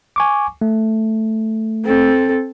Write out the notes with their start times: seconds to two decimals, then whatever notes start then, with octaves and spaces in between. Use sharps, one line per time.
0.16 G#5 C#6 D6
0.62 A3
1.85 C4 A4